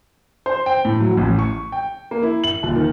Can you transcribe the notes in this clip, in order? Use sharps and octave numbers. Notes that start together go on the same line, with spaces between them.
C5
G5
A2
F#3
A1
C#6
G5
A#3
E4
F#7
D#1
D#3